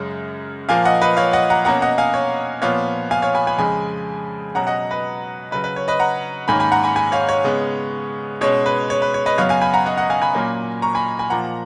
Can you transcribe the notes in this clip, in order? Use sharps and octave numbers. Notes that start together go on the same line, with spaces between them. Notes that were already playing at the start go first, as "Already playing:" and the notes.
Already playing: F#2 C#3 G#3 C#4
A#2 F3 A#3 F5 G#5
D#5 F#5
B4 D#5
C#5 F5
D#5 F#5
F#5 A#5
B2 A#3 C#4 F#5 A#5
D#5 F#5
F5 G#5
C#5
A#2 F3 B3 C#5 F5
F5 G#5
C#5 F5
G#5 B5
G#5 B5
F2 C#3 G#3 G#5 B5
B2 F#3 C#4 F#5 A#5
D#5 F#5
B4 D#5
C#3 F#3 C#4 B4
B4
C#5
B4 D#5
F#5 A#5
G#2 D#3 A#3 C#4 G#5 B5
G#5 B5
F#5 A#5
G#5 B5
G#5 B5
C#5 F5
C#5
C#3 G#3 B3
B2 G#3 C#4 C#5
B4
C#5
B4
C#5
B4 D#5
F#2 C#3 F#3 B3 C#5 F5
F5 G#5
G#5 B5
F#5 A#5
D#5 F#5
D#5 F#5
F5 G#5
G#5 B5
A#2 F#3 A#3 C#4
A#5 C#6
G#5 B5
G#5 B5
A#2 F3 A#3 F#5 A#5